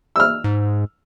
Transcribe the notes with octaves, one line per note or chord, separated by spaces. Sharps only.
E6 F6
G#2